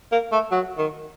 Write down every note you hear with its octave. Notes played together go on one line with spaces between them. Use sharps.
A#3
A3
F#3
D#3